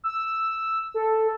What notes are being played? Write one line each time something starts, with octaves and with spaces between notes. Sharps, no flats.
E6
A4